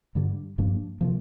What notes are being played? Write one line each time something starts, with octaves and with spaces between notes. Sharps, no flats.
G2 D3 G3
G2 F3 A#3 D4
C3 F3 A#3